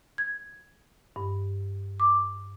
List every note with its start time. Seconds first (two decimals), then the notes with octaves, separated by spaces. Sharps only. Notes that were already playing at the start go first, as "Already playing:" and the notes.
0.18 G#6
1.16 G2
2.00 D6